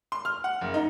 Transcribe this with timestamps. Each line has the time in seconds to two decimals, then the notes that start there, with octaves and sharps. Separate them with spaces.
0.12 C6
0.25 F6
0.44 F#5
0.61 F#1
0.74 D#4